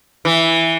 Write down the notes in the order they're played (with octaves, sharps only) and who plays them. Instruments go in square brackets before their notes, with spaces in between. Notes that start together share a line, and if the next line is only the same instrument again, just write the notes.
[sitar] E3